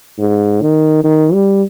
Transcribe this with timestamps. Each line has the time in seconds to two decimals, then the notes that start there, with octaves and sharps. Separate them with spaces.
0.19 G#2
0.62 D#3
1.04 D#3
1.33 G3